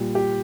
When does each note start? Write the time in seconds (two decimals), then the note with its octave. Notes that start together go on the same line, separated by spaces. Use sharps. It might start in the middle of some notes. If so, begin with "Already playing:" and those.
Already playing: A#2 G3
0.15 G4